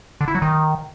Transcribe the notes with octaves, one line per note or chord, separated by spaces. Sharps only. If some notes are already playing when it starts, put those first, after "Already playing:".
D3
E4
F#3
D#3